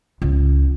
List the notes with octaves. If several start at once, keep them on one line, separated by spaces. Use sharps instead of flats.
C#2